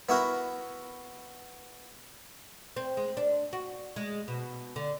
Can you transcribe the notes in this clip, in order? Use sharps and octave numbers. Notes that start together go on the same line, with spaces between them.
B3 E4 F#4 A#4
C4
G#3
D4
F#4
G#3
B2
D3